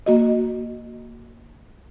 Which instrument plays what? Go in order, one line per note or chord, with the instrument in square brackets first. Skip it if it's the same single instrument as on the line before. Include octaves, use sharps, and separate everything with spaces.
[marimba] A#3 F#4 D#5